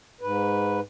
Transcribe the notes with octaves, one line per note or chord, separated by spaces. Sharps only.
G#2 B4